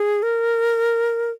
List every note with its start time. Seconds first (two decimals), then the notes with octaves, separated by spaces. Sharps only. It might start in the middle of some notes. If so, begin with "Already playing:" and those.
Already playing: G#4
0.23 A#4